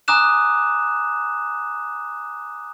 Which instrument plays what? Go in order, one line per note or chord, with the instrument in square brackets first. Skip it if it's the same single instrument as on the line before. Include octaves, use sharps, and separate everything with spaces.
[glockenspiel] G#5 A#5 D6 D#6 F#6 E7